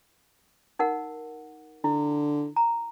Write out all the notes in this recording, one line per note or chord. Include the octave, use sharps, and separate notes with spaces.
D#4 A#4 F#5
D3 E4
A#5